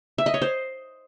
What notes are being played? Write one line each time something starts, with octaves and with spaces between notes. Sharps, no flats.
E5
D#5
C#5
C5